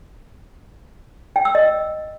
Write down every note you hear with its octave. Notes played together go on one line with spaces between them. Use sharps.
G5
E6
D#5